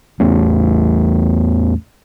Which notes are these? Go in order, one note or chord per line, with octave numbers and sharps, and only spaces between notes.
A1 E2 A3 C#4